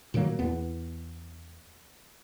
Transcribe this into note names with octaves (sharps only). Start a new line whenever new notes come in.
A#2 D#3 F#3 A#3
E2 B3